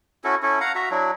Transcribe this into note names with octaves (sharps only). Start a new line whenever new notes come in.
C#4 E4 F#4 A4
C#4 E4 A4
F5 F#5 A#5
F#4 E5 A#5
F#3 D4 E4